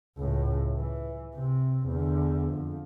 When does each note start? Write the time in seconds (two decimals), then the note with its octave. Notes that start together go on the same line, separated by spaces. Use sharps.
0.18 C#2 A2
0.77 E3
1.34 C3 C4
1.87 E2 D3
2.52 F2